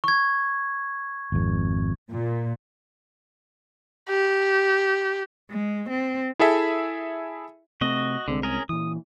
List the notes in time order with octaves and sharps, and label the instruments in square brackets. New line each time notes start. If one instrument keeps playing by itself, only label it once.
[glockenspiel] C#6 G#6
[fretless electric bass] G#1 F2
[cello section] A#2
[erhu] G4
[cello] G#3
C4
[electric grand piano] E4 G#4 A4 E5
[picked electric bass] C3 A3 C4 [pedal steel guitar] F#4 D#5
[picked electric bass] C2 G#3 C4 [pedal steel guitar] D3
[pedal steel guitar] C#4 G#4 A#4
[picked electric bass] A#2 E3 [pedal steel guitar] D#6